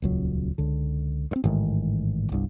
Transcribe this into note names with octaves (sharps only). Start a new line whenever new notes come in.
D#1 C#2 F#3
C#2 D3
G2 C4
A1 G#2 D#3 G#3
G1 C2 G2